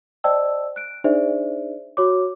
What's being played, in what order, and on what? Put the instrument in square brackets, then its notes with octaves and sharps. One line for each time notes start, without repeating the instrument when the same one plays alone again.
[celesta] C5 D5 D#5 G5 A5 E6
F#6 D7
D4 D#4 G#4 C5 D5 E5
F#4 C#5 D6